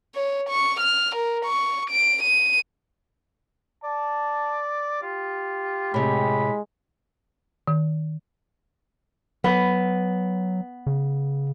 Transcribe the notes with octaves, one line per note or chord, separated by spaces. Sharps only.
C#5
C#6
F6
A#4
C#6
D7
D#7
D5 A5
F4 G4
A2 C3 G#3 B5
D#3
F#3 B3
C#3